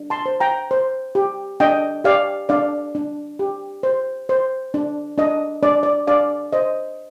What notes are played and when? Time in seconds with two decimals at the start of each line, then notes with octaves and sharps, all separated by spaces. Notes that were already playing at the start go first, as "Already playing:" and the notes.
Already playing: D4
0.10 A5 C6
0.26 C5
0.40 G5 A#5
0.71 C5
1.15 G4
1.60 D4 D#5 G5
2.04 G4 D5 F5
2.49 D4 D5 F5
2.95 D4
3.39 G4
3.83 C5
4.29 C5
4.74 D4
5.18 D4 D#5
5.63 D4 D5
5.83 D5
6.07 D4 D5 F5
6.53 C5 D#5